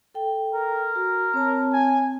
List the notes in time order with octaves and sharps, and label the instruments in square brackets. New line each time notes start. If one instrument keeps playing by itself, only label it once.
[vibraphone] A4 G5
[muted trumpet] A#4
[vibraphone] F#4
C4 C#5 A5
[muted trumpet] G#5